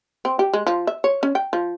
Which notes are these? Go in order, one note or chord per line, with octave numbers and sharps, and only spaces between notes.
C4
G4
G#3
F3
E5
C#5
C#4
G5
F3